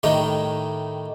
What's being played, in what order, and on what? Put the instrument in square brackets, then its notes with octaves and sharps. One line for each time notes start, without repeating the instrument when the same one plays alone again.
[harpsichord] A2 D#3 G3 A3 D#4